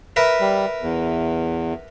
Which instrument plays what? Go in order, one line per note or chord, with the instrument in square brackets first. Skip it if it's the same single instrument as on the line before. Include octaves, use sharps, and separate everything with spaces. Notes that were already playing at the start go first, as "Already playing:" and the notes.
[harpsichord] A#4 B4 E5
[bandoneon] G3
E2